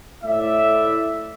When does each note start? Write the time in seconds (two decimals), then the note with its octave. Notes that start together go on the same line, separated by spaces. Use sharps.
0.24 A2 E4 D5 E5